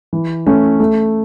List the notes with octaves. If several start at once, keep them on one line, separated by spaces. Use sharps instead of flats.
E3
A3 C#4
A3